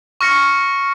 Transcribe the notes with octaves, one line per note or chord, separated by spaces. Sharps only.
C#6 F6 A#6 C#7